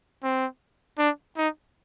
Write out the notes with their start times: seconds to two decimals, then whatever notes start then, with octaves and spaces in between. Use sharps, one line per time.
0.23 C4
0.98 D4
1.37 D#4